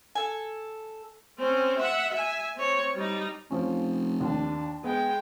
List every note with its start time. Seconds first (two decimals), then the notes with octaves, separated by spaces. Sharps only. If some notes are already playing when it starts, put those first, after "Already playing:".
0.15 A4 G#5
1.39 C4 C#4
1.78 E5 F#5
2.12 E5 G#5
2.56 C4 C#5
2.95 G3 D#4
3.51 F1 F3 C#4
4.21 D#2 D4
4.84 G#3 B3 G5